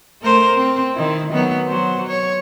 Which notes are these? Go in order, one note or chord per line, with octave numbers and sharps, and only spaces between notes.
A3 A#4 C5
C4
D#3 E4
D#3 F#3 B3
F#3 C5
C#5